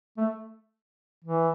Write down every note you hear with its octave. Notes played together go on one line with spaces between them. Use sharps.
A3
E3